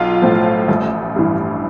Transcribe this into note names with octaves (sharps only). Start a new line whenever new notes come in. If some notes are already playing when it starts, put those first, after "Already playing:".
Already playing: B1 F4
A2 F3
A1
G2 E3